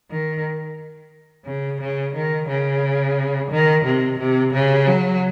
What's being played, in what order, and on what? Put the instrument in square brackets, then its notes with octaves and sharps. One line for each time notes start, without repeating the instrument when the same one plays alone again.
[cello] D#3
C#3
C#3
D#3
C#3
D#3
C3
C3
C#3
F#3